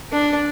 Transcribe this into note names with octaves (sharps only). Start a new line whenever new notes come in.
D4